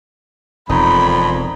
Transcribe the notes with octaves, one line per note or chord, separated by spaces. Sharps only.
E1 F2 D#4 B5